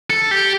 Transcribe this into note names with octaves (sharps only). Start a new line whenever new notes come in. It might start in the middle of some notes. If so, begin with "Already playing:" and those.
A4
G4